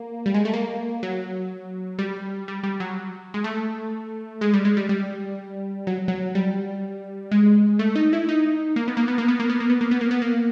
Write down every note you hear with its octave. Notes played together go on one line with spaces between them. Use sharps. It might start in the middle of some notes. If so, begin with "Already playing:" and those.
Already playing: A#3
G3
G#3
A3
A#3
F#3
G3
G3
G3
F#3
G#3
A3
G#3
G3
G#3
G3
G3
F#3
F#3
G3
G#3
A3
D#4
E4
D#4
A#3
B3
A#3
B3
A#3
B3
A#3
B3
A#3
B3
A#3
B3
A#3
B3
A#3